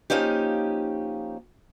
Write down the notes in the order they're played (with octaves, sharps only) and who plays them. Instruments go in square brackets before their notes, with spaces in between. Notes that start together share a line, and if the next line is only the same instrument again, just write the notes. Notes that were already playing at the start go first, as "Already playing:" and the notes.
[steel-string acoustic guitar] F3 A#3 C#4 D#4 G4